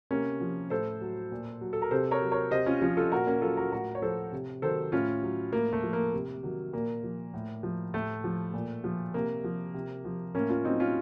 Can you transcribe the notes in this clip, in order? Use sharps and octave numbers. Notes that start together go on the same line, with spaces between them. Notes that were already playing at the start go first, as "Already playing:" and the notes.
C3 A#3 C#4
F3
A2 A4 C5
F#3
A#2
F#3
A4
A#4
C3 A4 C5
A#4 C#5
F#3
A#4 C#5
C3 C5 D#5
C#4 F4
F3 C#4 F4
F4 A4
A#2 F#4 A#4
A#3 C#4
F#3 F4 A4
F#4 A#4
A2 F#4 A#4
C#5
F3 A4 C5
C3
D#3 F#3 A4 C5
A2 C#4 F4
F#3
A2 A#3
A3
F3
A#3
C3
D#3 F#3
A#2 A#3
F3
A2
F3
A2 A3
F3
A#2
F3
C3 A#3
F3
C3
F3
A2 A#3 C#4
C#4 F4
F#3 C4 D#4
C#4 F4